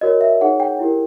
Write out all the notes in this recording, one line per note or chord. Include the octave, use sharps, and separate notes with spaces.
F#4 A#4 C#5 D#5
E5
D#4 G#4 C#5 F#5
G5
E4 G4 A#4